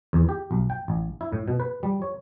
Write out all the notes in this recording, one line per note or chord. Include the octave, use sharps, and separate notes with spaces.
E2
G4
B1
G5
A1
E4
A2
B2
B4
G3
C#5